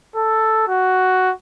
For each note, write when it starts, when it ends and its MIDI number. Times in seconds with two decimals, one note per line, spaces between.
0.16 0.68 69
0.68 1.31 66